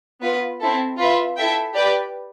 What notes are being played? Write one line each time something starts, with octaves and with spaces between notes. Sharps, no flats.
B3 F4 B4
C4 E4 A4
F4 B4 E5
E4 A4 E5 G5
G4 B4 D5 G5